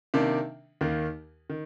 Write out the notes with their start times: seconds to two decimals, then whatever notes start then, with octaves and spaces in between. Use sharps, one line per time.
0.14 C3 D#3 A#3 D4
0.81 D#2 D#3 A#3
1.50 D#3